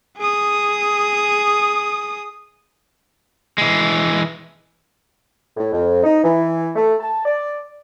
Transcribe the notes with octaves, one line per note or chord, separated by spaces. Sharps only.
G#4 D#6
E3 G#3
A2
F2
D#4
E3
A3
A5
D5